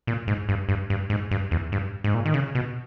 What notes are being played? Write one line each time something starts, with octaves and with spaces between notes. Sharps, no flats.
A#2
G#2
G2
G2
G2
G#2
G2
E2
G2
G#2
A#2
D#3
C#3
B2